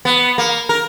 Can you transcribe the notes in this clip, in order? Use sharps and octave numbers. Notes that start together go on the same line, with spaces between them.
B3
A#3
A#4